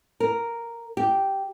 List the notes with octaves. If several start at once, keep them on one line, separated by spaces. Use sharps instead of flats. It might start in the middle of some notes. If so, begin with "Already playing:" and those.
A#4
G4